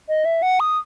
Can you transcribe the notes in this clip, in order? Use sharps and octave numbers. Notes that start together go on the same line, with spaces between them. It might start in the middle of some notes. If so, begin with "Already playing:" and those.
D#5
E5
F#5
D#6